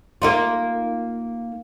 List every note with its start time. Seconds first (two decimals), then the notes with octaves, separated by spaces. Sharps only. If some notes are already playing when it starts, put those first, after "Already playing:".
0.22 A#3 D#4 F4